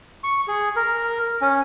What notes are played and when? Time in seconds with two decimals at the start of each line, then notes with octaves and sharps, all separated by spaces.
0.24 C#6
0.48 G#4
0.76 A#4
1.41 C#4